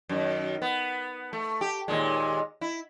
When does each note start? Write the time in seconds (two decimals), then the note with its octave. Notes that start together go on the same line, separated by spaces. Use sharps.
0.09 F#2 D#3
0.62 B3
1.33 A3
1.61 G4
1.88 D#2 A#2 G#3
2.61 E4